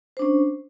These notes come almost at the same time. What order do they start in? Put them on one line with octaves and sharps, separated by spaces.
C5 D4 C#4